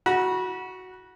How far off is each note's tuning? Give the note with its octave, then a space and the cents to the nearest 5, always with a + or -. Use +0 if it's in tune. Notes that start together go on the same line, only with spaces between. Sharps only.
F#4 +0 B5 -35